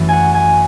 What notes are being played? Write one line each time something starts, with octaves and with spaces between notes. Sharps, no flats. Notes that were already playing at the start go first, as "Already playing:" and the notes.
Already playing: F#2 E3 A3
F#5 G#5
G#5